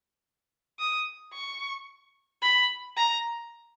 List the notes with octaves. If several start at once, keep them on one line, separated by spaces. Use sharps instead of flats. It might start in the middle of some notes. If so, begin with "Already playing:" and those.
D#6
C#6
B5
A#5